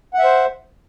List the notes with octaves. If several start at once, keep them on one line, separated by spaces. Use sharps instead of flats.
C5 E5 F#5